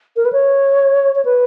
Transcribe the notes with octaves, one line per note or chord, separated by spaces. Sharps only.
A#4
B4
C#5
C#5
B4